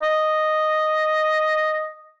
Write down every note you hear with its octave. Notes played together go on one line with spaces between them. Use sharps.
D#5